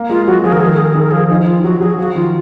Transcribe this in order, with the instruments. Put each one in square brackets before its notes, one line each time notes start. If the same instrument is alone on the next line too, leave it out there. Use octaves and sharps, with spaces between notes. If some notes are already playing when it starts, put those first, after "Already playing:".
Already playing: [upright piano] A#3
[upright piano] G#3 [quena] F4
[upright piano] F#3 [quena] F#4
[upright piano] F3 [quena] G#4
[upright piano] D#3 [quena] A#4
[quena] G#4
[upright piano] D#3 [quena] A#4
[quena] G#4
A#4
[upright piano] D#3 [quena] G#4
[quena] A#4
[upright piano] F3 [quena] G#4
[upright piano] F3 [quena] D#4
[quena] D#4
F4
[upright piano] F#3 [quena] F#4
[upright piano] F#3 [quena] G#4
[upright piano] F3 [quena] F#4
[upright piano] D#3 [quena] F4